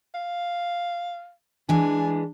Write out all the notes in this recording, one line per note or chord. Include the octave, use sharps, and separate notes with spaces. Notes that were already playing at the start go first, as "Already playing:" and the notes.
F5
E3 G#3 D4 G#5